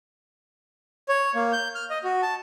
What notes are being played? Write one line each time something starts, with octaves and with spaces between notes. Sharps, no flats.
C#5
A#3
G6
F6
D#5
F#4
A5